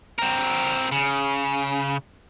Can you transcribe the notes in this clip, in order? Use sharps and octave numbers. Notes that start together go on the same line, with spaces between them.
C4 A#4
C#3